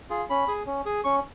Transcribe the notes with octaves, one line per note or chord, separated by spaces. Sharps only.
F4 G#4
C#4 B5
G#4
C#4
G#4
C#4 C#6